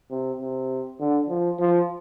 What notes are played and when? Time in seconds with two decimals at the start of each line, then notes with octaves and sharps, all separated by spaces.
0.11 C3
0.41 C3
1.00 D3
1.29 F3
1.59 F3